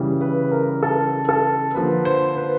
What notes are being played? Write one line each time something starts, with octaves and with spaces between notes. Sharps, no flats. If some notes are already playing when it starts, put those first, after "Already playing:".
Already playing: C#3 E3 G3
B4
A#4
A4
A4
D3 F3 A#3 B4
C5
B4